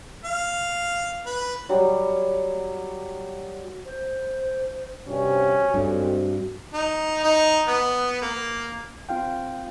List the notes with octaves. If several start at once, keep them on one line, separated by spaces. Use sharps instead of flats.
F5
B4
F#3 G3
C5
G2 C3 C#4 F#4
G2 G#3 A3 C4
D#4
D#4
B3
A#3
C4 F4 F5 G5